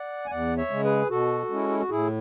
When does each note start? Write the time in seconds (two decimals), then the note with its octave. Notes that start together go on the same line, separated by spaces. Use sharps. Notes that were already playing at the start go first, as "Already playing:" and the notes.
Already playing: D5 F#5
0.26 G#5
0.30 E2 D5 F#5
0.57 C#5 E5
0.70 C#3 G#3
0.84 G#4 B4
1.10 B2 F#4 A4
1.50 G#3 C#4 E4
1.69 E4
1.79 F#4
1.90 A2 E4 G#4